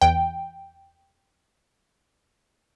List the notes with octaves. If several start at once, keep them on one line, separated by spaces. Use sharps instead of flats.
E2 G5